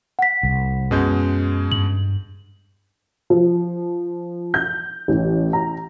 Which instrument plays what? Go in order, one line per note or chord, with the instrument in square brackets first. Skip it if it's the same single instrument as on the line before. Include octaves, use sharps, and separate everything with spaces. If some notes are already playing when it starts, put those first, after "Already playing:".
[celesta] F#5 B6
[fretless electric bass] C2
[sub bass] F#2 [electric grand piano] B2 G#3 G6 [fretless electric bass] C#4
[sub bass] G2 [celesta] F#7
[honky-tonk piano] F3
G6
A1
A#5